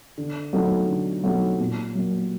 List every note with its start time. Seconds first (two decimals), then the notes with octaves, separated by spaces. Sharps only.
0.18 D3
0.53 F#3 A3 C4 D#4
0.88 D3
1.24 F#3 A3 C4 D#4
1.59 A#2
1.95 F#3 A#3